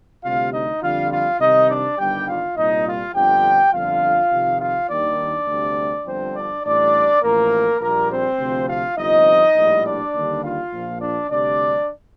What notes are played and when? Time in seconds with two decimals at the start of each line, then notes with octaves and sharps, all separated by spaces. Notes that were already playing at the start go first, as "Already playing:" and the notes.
0.23 D2 C3 G3 F4 F5
0.52 D#4 D#5
0.81 F2 D3 G3 F4 F5
1.11 F4 F5
1.40 C2 C3 D#3 D#4 D#5
1.69 D4 D5
1.98 G1 G2 D#3 G3 G4 G5
2.27 F4 F5
2.56 C2 A#2 G3 D#4 D#5
2.86 F4 F5
3.14 G1 F2 D3 F3 G4 G5
3.73 G1 F2 D3 F4 F5
4.31 F2 C3 D#3
4.60 F4 F5
4.89 D#2 D#3 G3 D4 D5
5.47 D2 C3 G3
6.05 G1 G2 D3 F3 C4 C5
6.35 D4 D5
6.63 A1 A2 G3 D4 D5
7.22 A1 A2 F3 A#3 A#4
7.81 A#1 A#2 G3 A#3 A#4
8.09 C4 C5
8.39 D2 C3 F3
8.67 F4 F5
8.96 G1 F2 C3 F3 D#4 D#5
9.55 A#1 A2 G3
9.84 D4 D5
10.13 D#2 D3 G3
10.42 F4 F5
10.72 A#1 A#2 F3
11.00 D4 D5
11.29 D2 C3 G3 D4 D5